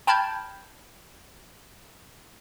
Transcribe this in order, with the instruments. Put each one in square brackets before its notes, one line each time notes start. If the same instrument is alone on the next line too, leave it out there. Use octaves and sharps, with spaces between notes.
[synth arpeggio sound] G5 A5 B5 F6 G6 G#6